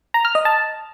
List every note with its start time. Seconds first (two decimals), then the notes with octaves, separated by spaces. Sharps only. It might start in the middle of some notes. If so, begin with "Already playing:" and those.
0.14 A#5
0.25 F6
0.35 D#5
0.45 A5